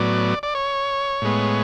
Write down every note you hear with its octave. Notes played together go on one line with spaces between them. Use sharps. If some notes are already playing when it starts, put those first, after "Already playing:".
Already playing: A2 F#3 B3 D5
D5
C#5
A2 G#3 B3